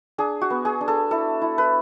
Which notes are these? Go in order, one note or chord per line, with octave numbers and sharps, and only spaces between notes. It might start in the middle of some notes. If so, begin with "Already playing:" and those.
D4 G#4
F#4
B3
G#4
D4
A4
E4 A4
E4
B4